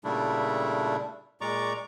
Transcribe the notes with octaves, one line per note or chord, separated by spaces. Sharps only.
A#2 C#3 G3 A3 D4 E4
A#2 G#3 D5 A#5 C#6 D6